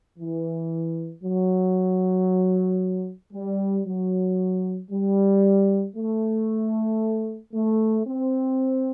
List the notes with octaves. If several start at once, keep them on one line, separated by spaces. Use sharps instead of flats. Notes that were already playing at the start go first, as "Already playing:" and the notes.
E3
F#3
G3
F#3
G3
A3
A3
C4